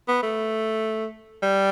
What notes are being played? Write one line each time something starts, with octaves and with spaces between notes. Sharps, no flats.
B3
A3
G3